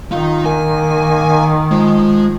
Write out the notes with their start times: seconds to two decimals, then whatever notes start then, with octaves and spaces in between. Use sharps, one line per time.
0.12 D#3 D#4 F4
0.45 A#3 G#5
1.71 F3 G#3